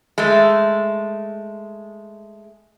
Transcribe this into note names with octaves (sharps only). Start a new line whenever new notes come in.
G#3 A3